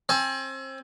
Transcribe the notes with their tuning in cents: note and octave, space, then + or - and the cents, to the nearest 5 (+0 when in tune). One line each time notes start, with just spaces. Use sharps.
C4 +30 G#5 +35